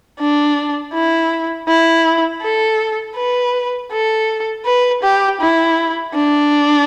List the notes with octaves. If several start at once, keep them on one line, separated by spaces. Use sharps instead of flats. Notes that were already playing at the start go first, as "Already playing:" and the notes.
D4
E4
E4
A4
B4
A4
B4
G4
E4
D4